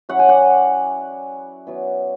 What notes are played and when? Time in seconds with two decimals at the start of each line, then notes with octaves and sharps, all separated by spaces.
0.09 F#3 C#4 E4 F#5
0.19 G#5
0.29 D5 F#5
1.67 F#3 B3 E4